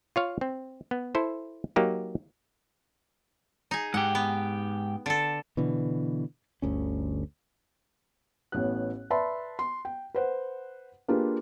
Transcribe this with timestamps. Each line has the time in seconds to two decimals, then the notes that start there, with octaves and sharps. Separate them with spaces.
0.16 F4 C#5 F5
0.41 C4
0.91 B3
1.15 E4 A4 C5
1.76 F#3 A#3 D#4 G4
3.71 D#4 G#4
3.94 G#2 G4 F#5
4.15 B3
5.06 D3 A4
5.57 B2 D3 E3
6.62 G1 D2 C#4
8.52 A1 A2 B3 B4 F#6
9.10 B4 D5 E5 A5 B5 C6
9.59 C6
9.85 G5
10.15 B4 C5 F#5
11.08 A#3 D4 F4 G4 G#4 B4